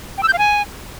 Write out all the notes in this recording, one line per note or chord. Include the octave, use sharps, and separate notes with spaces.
G5
E6
G6
F5
G#5